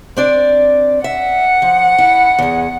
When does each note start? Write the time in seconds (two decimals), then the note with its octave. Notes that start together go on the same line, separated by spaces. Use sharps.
0.17 C4 D4 D5
1.04 E5 F#5
1.62 F3
1.98 E4
2.39 E2 G#4